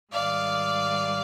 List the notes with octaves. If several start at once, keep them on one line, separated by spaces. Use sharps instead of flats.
G#2 D#3 G3 D5 F5